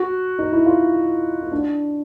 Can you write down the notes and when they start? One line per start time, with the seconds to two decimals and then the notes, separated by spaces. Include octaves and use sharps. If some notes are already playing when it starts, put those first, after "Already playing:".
Already playing: F#4
0.39 D#4
0.52 E4
0.66 F4
1.42 D#4
1.52 D4